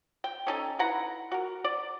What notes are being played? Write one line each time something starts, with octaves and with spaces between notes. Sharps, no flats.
G5
C#4 D#4 A4
E4 B4 F#5 A#5
F#4 A#4
D5